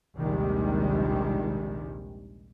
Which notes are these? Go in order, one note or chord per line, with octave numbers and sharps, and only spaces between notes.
A#1 D#2 C3 D#3 G3 G#3